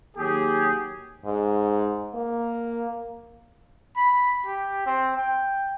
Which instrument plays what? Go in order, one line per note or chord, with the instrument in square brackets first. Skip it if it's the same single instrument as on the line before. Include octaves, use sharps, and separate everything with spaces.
[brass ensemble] D#2 F#3 G4 G#4
[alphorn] G#2
A#3
[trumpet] B5
G4
C4
G5